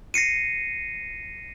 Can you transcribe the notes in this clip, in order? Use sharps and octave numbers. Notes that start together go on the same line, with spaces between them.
A#6 C7 C#7 D#7